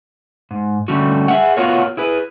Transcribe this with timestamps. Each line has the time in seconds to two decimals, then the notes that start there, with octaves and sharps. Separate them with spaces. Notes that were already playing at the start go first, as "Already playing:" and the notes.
0.51 G#2
0.88 D3 G3 A3 C#4 F#4
1.28 G#4 E5 F#5
1.57 B3 F4 F#4 A#4 C#5
1.97 E4 G#4 B4